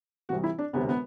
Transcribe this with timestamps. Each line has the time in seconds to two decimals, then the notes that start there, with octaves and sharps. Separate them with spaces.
0.29 C2 C3 E3 F#4
0.44 E4
0.59 D4
0.73 E1 D2 C3 B3
0.89 B3